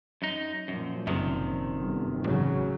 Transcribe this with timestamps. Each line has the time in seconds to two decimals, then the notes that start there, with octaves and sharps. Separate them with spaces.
0.22 F#2 D#4
0.68 F#2 A#2 F3
1.07 F#1 F#2 C3 D#3
1.80 G1
2.24 A1 C#3 F#3